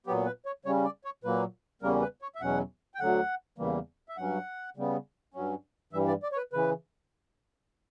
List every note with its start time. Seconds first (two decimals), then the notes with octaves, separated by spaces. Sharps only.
0.06 A#2 F#3 B3 G4
0.25 B4
0.46 C#5
0.65 C#3 G3 C#4 C#5
0.85 D5
1.04 C#5
1.24 A#2 F#3 A#3 B4
1.82 E2 C#3 G3 A#3 C#4 A#4
2.01 B4
2.22 C#5
2.35 E5
2.41 E2 B2 F#3 C#4 F#5
2.95 G5
3.00 D2 D3 F#3 F#5
3.58 E2 C#3 E3 G3 A#3
4.09 E5
4.17 G2 F#3 C#4 F#5
4.77 C#3 G3 B3
5.34 G2 F#3 C#4
5.93 G2 E3 G3 E5
6.07 D5
6.23 D5
6.32 C#5
6.37 B4
6.53 C#3 E3 B4